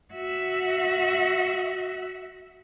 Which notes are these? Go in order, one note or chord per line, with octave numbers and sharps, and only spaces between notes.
F#4 E5